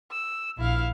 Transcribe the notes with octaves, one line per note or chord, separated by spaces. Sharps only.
E6
A#1 E4 F5